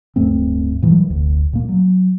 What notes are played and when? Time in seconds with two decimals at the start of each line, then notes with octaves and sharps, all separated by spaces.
0.16 D1 G2 A3 C4
0.82 A#2 E3 F#3 G3
1.08 F1 D2
1.53 A#2 A#3
1.68 F#3